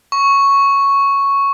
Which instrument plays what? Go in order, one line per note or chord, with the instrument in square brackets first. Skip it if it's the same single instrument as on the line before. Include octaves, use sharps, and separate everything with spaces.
[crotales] C#6